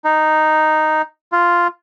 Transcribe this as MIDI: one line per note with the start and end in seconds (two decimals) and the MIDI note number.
0.04 1.02 63
1.32 1.67 65